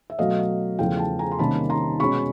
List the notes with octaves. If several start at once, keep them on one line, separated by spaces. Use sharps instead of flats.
E5
B2 F#3 A3 D#5 F5
E2 C#3 F3 A3 F5 G5
G5 A5
G#5 A#5
C6
C3 D#3 G3 A#3 C#4 A5 B5
A#5 C6
B2 G#3 C#4 B5 C#6